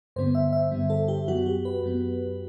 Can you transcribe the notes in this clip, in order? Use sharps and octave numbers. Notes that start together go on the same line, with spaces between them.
G2 D3 G3 B3 C5
E5
E5
G2 D3 G3 B3
A4
G4
F#2 F#3 B3 F#4
G4
B4
F#2 F#3 B3